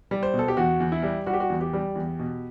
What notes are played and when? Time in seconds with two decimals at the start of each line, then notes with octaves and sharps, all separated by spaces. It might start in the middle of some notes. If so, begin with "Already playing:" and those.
0.11 G3
0.23 C5
0.34 B2
0.39 A4
0.48 G4
0.57 E2 F#4
0.80 E2
0.92 E4
1.03 G3
1.27 G3 F#4
1.33 G4
1.40 F#4
1.50 E2
1.61 G4
1.73 G3
1.95 E2
2.19 B2